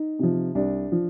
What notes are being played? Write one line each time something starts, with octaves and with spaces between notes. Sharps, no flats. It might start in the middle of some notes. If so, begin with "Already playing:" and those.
Already playing: D#4
C3 F3
C2 D4
F3